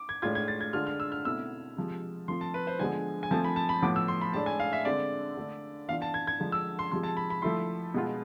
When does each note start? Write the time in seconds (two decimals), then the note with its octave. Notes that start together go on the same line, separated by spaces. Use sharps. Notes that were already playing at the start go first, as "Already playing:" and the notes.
Already playing: D6
0.09 G#6
0.22 A2 G#3 D4 F4 G#6
0.35 G#6
0.48 A6
0.61 G#6
0.73 D3 G#3 D4 F4 F6
0.87 F6
1.00 E6
1.12 F6
1.25 B2 A3 C4 E4 E6
1.76 C3 F3 G#3
2.28 F3 A3 C4 F4 C6
2.41 A5
2.54 B4
2.67 C5
2.79 D3 F3 G#3 B3 G#5
3.23 G#5
3.31 F3 A3 C4 F4 A5
3.44 B5
3.56 A5
3.69 B5
3.82 A2 F3 B3 D6
3.96 E6
4.08 C6
4.21 B5
4.33 A2 G#3 D4 A5
4.46 G#5
4.60 F5
4.73 E5
4.85 D3 G#3 C4 D5
5.37 D3 A3 D4
5.88 E3 B3 D4 F4 F5
6.02 A5
6.14 G#6
6.27 G#6
6.40 D3 F3 G#3
6.52 E6
6.79 C6
6.91 C3 F3 G#3 C6
7.03 A5
7.17 B5
7.30 B5
7.42 F3 A3 E4 C6
7.94 B2 G#3 B3 F4